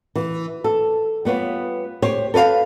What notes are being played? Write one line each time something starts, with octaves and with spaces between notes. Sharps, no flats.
E3
A4
G3 B3 F4 C#5
G4 C5 C#5
A4 B4 C#5 F5